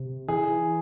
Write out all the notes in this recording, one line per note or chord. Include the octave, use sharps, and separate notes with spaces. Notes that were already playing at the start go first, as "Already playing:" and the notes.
Already playing: C3
E3 G#4
E3